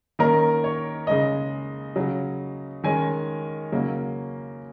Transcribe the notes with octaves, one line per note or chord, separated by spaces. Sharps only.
D#3 A#3 C#4 A#4
C#5
C#3 G#3 C#4 D#5
C#3 F#3 C#4
D#3 G#3 C#4 G#5
C#3 F#3 A#3 C#4